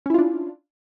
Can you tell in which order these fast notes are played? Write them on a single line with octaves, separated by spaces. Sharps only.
C#4 E4 F4 D4